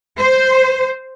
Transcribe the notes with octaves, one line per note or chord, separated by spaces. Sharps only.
C5